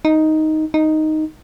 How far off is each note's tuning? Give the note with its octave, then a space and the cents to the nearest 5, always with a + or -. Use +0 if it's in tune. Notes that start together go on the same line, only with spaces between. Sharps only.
D#4 +5
D#4 +0